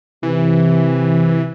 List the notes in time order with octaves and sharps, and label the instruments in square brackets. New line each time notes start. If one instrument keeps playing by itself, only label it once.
[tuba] C3 [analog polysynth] E3